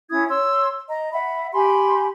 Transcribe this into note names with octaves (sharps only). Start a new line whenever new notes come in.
C#4 E4 D#6 G#6
C#5 C6 E6
D#5 A#5
E5 F#5 B5
G4 G#5 B5 C6